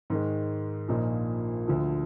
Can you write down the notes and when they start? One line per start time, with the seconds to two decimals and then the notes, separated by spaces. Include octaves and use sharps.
0.10 G#2 D#3 G#3
0.88 A#1 A#2 F3 A#3 D#4
1.68 D2 D3 F3